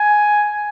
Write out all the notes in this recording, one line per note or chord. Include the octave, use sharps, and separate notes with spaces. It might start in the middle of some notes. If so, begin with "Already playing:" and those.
Already playing: G#5